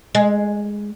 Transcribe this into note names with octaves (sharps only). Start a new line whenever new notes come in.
G#3